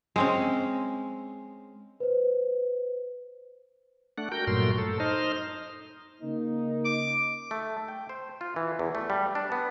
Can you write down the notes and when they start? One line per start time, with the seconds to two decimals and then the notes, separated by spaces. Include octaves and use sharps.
0.16 G#3 C4 C#4
2.00 B4 C5
4.18 A3 D4 F#5
4.32 F#4 A#4 G5 G6
4.47 G2 A#2 F#3 A3 A#4 C6
4.78 A4
5.00 D#4 C5 D#5 F6
6.20 C#3 A#3 D#4
6.85 D6
7.51 A3
7.88 G5
8.09 C5
8.41 F4
8.56 E3
8.79 E2
8.95 A3
9.10 G3
9.35 D4
9.52 B3